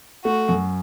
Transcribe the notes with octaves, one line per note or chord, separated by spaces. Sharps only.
A3 F#4
F#2